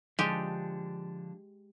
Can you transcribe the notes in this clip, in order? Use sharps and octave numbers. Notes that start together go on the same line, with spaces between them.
D3 F3 G#3 D4 G4